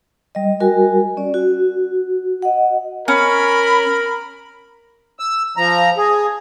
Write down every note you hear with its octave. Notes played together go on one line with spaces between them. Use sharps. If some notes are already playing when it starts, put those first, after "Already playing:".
G3 D#5
G3 F#4 A#4 G#5
C#4 D5
F#4
D#5 F#5
C#4 A#4 B5
E6
F3 A#5
G#4